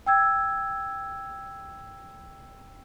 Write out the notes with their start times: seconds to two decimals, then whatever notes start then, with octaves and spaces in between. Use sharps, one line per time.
0.06 G5 E6 G#6